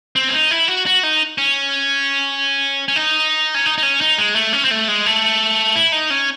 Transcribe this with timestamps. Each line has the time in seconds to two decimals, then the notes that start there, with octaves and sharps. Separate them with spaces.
0.16 C4
0.29 C#4
0.33 D#4
0.51 E4
0.68 F#4
0.86 F#4
1.03 D#4
1.38 C#4
2.88 C#4
2.96 D#4
3.54 C#4
3.66 D#4
3.78 D#4
3.83 C#4
4.01 D#4
4.18 G#3
4.35 A3
4.53 C#4
4.64 C4
4.71 A3
4.88 G#3
5.06 A3
5.76 E4
5.92 D#4
6.10 C#4